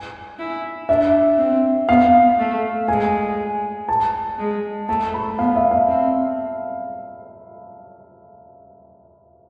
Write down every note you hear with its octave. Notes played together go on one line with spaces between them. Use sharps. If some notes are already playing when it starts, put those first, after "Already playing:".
Already playing: G#5
E4
D4 E5
C4
B3 F5
A3
G#3 G#5
A5
G#3
A3 A5
B5
B3 F5
E5
F5
C4